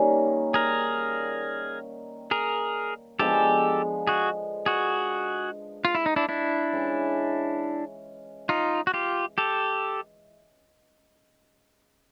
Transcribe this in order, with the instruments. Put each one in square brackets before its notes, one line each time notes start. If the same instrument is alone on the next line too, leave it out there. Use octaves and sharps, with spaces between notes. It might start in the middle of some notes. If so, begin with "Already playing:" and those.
Already playing: [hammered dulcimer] D#3 G3 A#3 C#4
[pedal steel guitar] G#4 A#4
G#4 A#4
[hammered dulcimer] D3 F3 G#3 B3 [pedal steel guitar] G4 A4
[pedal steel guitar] F#4 G#4
F#4 G#4
F4
E4
D#4
D4 E4
D4 E4
[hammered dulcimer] E3 G#3 C#4
[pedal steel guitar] D#4 F4
F#4
F4 G4
G4 A4